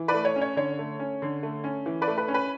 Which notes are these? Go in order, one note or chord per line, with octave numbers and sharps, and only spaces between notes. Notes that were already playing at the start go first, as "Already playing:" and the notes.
Already playing: E3
B4 D5
A3
C#5
C#4
C#5
D3 C#5
A3
C#4
D3
A3
C#4
E3
B4 D5
A3
B4
C#4
B4